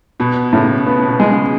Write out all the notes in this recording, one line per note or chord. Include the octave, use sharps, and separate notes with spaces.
B2 B3
A2 C#3
C#3 B3
B2
G#3
C#3